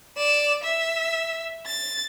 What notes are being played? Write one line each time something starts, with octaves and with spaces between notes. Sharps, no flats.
D5 E7
E5
A6